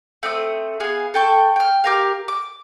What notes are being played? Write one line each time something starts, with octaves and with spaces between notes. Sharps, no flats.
A3 C4 D#6
B3 G#4 F5
A4 G5 C#6
G5 F6
G4 A#4 F5
D6